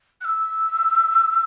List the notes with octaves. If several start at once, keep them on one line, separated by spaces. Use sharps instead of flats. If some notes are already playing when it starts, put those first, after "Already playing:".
F#6
E6